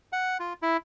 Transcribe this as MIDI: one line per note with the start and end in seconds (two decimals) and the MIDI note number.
0.13 0.38 78
0.40 0.53 65
0.62 0.77 64